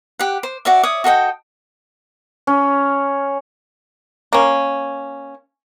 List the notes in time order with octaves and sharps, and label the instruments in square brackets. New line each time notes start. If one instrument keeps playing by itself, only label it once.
[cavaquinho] G4 F#5
C5
F#4 D5 E5
C#5 D5 E5 D#6
F#4 A4 D#5 G5
[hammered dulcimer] C#4
[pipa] A#3 C#4